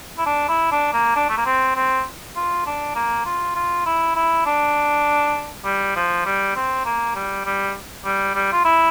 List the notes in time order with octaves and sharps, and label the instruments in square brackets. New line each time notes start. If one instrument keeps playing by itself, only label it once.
[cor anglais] E4
D4
E4
D4
A#3
D4
A3
A#3
C4
C4
F4
D4
A#3
F4
F4
E4
E4
D4
G3
F3
G3
C4
A#3
G3
G3
G3
G3
F4
E4